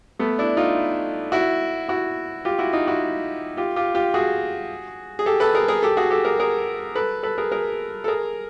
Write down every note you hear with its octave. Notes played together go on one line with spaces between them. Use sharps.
A3 B3
D4 E4
D#4 F4
E4 F#4
E4 F#4
F4 G4
E4 F#4
D#4 F4
E4 F#4
F4 G4
F4 G4
F4 G4
F#4 G#4
G#4
G4 A4
A4 B4
G#4 A#4
G#4 A#4
G4 A4
F#4 G#4
G4 A4
G#4 A#4
G#4 A#4
A4 B4
A4 B4
G#4 A#4
G#4 A#4
A4
G#4 A#4